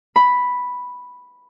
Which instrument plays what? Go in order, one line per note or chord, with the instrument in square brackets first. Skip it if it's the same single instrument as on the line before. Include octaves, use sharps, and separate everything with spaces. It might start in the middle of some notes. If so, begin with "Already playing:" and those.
[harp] B5